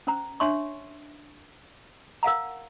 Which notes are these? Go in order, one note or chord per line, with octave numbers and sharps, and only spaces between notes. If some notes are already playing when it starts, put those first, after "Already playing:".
C#4 C5 A#5
D4 C#5 E5 C6 C#6
A#4 F5 F#5 A#5